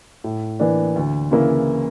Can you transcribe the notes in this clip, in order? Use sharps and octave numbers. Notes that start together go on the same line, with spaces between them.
A2
E3 A#3 D4
D2
C#3 E3 A#3 E4